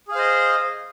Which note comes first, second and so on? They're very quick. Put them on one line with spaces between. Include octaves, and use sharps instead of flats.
G#4 F5 C5 D#5